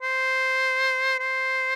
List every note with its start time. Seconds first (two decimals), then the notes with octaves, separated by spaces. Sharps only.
0.02 C5
1.19 C5